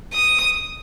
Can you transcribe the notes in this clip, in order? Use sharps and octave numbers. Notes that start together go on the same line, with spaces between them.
D#6